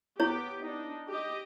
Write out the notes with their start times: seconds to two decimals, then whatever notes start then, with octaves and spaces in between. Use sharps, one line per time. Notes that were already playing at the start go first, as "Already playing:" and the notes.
0.20 B3 E4 G4 C#5 G5
0.61 D4 D#4
1.08 G4 D#5